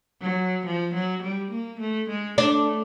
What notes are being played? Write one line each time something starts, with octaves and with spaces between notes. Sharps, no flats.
F#3
F3
F#3
G3
A#3
A3
G#3
A3 D4